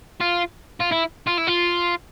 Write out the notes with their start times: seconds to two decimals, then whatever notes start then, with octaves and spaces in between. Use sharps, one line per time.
0.21 F4
0.81 F4
0.92 E4
1.27 F4
1.38 E4
1.48 F4